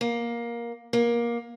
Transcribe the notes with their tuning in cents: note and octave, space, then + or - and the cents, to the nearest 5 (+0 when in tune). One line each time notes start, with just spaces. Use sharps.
A#3 +15
A#3 +20